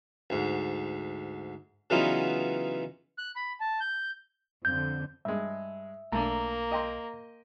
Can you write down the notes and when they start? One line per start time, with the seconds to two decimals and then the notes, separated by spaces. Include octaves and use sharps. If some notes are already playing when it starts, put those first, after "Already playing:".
0.30 D2 G#2
1.90 C#3 E3 F#3 B3 D#4 F4
3.18 F#6
3.36 B5
3.60 A5
3.80 G6
4.65 F2 D3 G6
5.25 G2 G#3 E5
6.12 B1 A3 A#3 D4 A#5
6.71 D#5 G5 C6